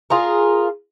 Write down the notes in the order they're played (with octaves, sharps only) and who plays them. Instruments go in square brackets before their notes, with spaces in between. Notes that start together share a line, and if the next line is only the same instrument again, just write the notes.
[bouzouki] F4 G#4 A#4